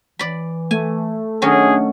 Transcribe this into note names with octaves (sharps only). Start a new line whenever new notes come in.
E3 D5 B5
A3 G#5
D#3 F#3 C#4 D4 G#4